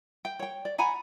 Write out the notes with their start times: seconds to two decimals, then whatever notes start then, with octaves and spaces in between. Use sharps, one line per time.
0.25 G5
0.39 C#5 G5
0.65 D5
0.78 F#5 G#5 A#5 B5